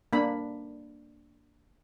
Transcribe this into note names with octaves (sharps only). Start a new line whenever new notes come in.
A#3 D4 B5